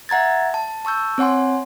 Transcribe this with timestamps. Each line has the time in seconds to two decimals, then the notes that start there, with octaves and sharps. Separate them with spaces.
0.09 E5 F#5 A#5 G#6 A6
0.54 A5
0.85 A5 C#6 E6 G6
1.18 C4 C#5 F#5 G#5 C6